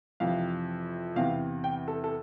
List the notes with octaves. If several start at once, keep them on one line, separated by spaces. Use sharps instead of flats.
F2 C3 E3 F5
E2 C3 E3 F5
G5
A4
A4